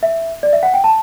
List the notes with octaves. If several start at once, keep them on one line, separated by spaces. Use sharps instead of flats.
E5
D5
E5
F#5
G5
A5